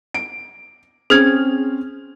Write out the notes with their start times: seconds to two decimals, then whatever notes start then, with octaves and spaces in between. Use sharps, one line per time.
0.14 D7
1.10 C4 C#4 G#4 F6 G#6